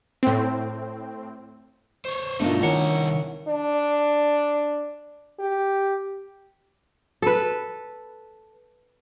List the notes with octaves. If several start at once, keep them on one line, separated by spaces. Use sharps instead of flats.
A2 C4
C5 C#5
G2 B2 A3 D4 D#4 F4 A#4
C2 D#3 C#4 D4 E4 A#4 F#5 C#6
D4
G4
A4 B4